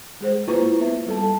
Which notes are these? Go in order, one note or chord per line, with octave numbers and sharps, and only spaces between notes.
G#3 G#4 C5
A#3 E4 F4 B4 A#5 C#6
B3 B4 E5
G3 A4 A5
A5